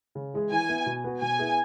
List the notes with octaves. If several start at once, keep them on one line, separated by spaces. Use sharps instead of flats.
C#3
E3 G#3 E4 G#4
E3 G#5
B3 E4
B2
B3 F#4
B2 G#5
B3 E4 G#4